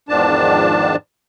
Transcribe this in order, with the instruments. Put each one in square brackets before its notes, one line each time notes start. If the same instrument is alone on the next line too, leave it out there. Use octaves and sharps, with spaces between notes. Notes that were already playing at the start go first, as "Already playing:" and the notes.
[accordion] E2 G#2 D#3 F3 D4 A5